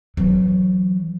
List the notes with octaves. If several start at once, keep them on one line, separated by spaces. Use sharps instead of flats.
E3 F#3